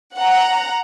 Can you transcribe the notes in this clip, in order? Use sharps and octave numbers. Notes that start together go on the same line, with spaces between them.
F#5 A#5